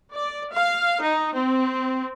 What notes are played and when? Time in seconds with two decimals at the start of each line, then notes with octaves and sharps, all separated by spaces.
0.13 D5
0.52 F5
1.03 D#4
1.36 C4